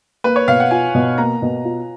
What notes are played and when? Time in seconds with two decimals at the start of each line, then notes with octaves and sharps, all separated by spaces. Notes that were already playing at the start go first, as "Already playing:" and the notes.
0.24 A#3 B4
0.36 C#5
0.48 B2 F5
0.60 F#5
0.71 F4 G#5
0.95 B2
1.18 A#3 A#5
1.42 B2
1.65 F4